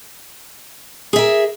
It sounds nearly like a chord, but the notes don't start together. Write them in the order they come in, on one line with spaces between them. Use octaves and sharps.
G#4 E5 A#4